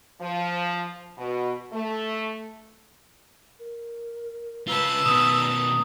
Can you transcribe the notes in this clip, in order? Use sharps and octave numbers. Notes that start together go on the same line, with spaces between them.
F3
B2
A3
A#4
C#3 F4 B4 A5 E6
B2 D#3 D#6
A#5